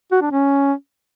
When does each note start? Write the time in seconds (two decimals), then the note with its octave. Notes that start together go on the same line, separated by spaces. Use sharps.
0.12 F#4
0.22 D4
0.31 C#4